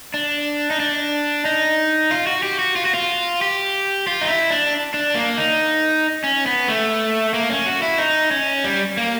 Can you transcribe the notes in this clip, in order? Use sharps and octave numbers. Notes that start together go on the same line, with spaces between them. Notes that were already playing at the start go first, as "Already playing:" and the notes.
D4
D#4
D4
D#4
F4
F#4
G4
F#4
F4
F#4
F4
G4
F4
D#4
E4
D4
D4
A#3
D#4
C#4
B3
A3
A#3
C#4
F#4
E4
D#4
C#4
G3
A#3